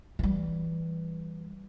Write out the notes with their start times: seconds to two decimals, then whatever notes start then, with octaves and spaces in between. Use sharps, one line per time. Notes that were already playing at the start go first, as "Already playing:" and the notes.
0.19 E3 G3